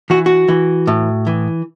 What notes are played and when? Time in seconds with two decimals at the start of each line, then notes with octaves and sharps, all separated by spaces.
0.10 E3 F#4
0.26 F#4
0.48 E3
0.87 A2
1.27 E3